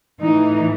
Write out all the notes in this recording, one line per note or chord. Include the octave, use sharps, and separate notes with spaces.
A2 E3 D#4